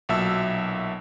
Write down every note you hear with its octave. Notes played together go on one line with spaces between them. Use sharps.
B1 A#2 F#3 E5 A5 E6